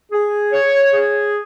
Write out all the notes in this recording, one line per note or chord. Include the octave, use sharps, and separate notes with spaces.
G#4
C#5
G#4